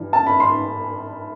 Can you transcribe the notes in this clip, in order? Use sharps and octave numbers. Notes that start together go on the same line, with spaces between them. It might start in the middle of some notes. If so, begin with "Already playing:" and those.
Already playing: G2 E3
A5
B5
C6